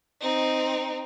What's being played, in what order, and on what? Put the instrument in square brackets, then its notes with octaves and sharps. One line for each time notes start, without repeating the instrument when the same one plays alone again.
[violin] C4 D#4